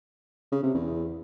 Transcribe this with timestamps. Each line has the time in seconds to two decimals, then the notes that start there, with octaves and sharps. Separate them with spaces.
0.52 C#3
0.63 C3
0.74 E2